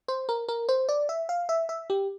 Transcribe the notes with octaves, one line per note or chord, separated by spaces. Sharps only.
C5
A#4
A#4
C5
D5
E5
F5
E5
E5
G4